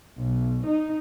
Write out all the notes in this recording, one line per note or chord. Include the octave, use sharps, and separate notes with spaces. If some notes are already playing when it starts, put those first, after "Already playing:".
B1
D#4